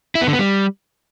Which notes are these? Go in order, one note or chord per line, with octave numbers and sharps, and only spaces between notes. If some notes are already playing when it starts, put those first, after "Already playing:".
E4
B3
D3
B3
G3